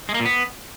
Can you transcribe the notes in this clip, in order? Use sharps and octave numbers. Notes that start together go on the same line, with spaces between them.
G#3
A#3
A#2
B3